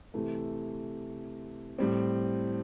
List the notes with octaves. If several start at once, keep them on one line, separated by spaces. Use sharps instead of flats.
C3 E3 A3
A2 G3 C4